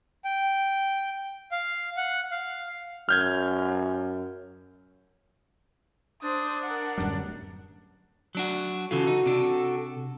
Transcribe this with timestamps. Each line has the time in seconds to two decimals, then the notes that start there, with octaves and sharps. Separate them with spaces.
0.25 G5
1.52 F5
1.97 F#5
2.31 F5
3.09 F#2 F6 G6 G#6
6.22 D4 C5 D#6
6.63 A#4 F#5
6.98 D1 F#2 G3
8.35 F#3 D4 F#4
8.91 C#3 E3 F4 F#4 A4
9.07 D#4
9.26 C3 D4